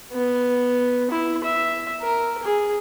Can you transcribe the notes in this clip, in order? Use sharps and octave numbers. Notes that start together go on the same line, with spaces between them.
B3
E4
E5
A#4
G#4